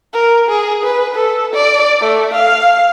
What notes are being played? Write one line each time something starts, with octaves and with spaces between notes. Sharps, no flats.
A#4
G#4
B4
A4
D5
A3
F5